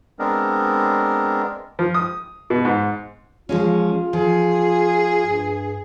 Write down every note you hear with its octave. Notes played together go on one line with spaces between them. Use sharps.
G#3 B3 C4 D4 A#4
F3
D#6
B2
G#2
F3 G#3 C#4 F4
F3 G#4
G2